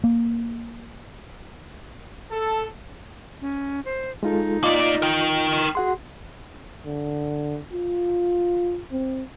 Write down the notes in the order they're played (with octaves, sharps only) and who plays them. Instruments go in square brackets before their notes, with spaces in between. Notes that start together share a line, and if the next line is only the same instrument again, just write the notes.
[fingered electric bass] A#3
[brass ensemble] A4
[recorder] C#4
C5
[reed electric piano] G#3 F4 A4 [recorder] D#4
[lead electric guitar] A#3 D5 [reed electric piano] F4 D#5
[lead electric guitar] A#4 G5
[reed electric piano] F#4 F#5 C6 [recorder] G#4
[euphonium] D3
F4
C4